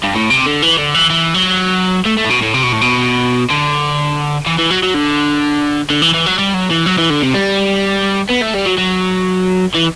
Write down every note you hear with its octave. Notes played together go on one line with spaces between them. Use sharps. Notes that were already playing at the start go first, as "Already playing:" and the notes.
G2
A2
C3
D3
E3
D3
E3
E3
F#3
A3
A3
A2
B2
A2
C3
B2
A2
B2
D3
E3
E3
F#3
F#3
D3
D3
E3
E3
F#3
G3
F#3
E3
F#3
E3
D3
C3
G3
B3
A3
G3
F#3
F#3
E3